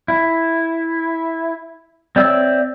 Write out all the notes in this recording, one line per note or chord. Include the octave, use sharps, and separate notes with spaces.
E4
C4 C#5 D5 E5 E6